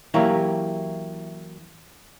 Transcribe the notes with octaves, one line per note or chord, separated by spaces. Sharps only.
E3 F#3 A#3 E4 G4 C#5